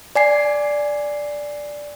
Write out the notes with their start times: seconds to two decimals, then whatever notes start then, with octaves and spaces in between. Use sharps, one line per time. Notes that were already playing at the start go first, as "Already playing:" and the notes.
0.16 D5 G#5 C7